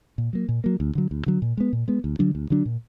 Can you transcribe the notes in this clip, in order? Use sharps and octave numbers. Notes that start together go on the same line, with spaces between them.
A#2
F#3 A#3
A#2
F#3 A#3
D2
D3 F#3
D2
D3 F#3
A#2
G#3 B3
A#2
G#3 B3
D2
D3 F#3 D4
D2
D3 F#3 D4
A#2